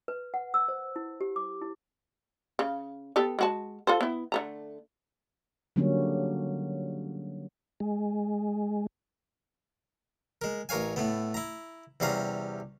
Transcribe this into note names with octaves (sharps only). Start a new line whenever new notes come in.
B4
F#5
E6
C5
E4
G4
D6
E4
C#3
B3 G4 A4
G#3 F#4 A5
F4 A4 C5
B3 E4
D3 A3 A#5
D3 F#3 G3 A#3 C#4
G#3
G#3 A#4
A1 A#4 C#5 F5 G#5
A2 A3 B3
E4 A#5
E2 C3 G3 C#4 F5 A#5